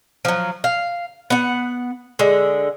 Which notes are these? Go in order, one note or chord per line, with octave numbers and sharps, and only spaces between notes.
F3 F#3
F5
B3 F#5
D3 G#3